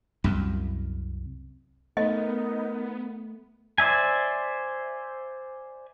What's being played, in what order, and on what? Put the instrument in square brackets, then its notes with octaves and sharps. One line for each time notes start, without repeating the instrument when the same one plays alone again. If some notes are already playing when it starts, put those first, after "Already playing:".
[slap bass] C2 F#2
[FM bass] A3 [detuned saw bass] B3 [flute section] D#4 A#4 [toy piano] D#5
[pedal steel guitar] C5 D5 E5 G#5